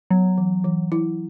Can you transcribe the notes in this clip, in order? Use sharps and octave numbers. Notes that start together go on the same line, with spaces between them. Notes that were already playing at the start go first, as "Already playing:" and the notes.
F#3 B3
E3
E3
E4